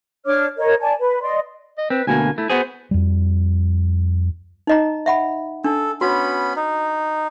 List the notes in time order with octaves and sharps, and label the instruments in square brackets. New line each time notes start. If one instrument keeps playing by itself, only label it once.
[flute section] D4 C#5 D6 F6
A#4 C#5 D#5
D5 G#5 A5
B4
D5 D#5 C6
[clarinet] D#5
[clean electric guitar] C4 [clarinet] B4
[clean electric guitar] D2 B2 A#3 [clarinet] G#5
[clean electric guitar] A3 [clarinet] E4
[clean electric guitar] B3 F#4 G#4 [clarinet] C5
[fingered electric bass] F2 G3
[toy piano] D#4 D#5 A#5
E5 F#5 B5
[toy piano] D4 [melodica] A4
[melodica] B3 C#4 B5 [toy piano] F#4
[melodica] D#4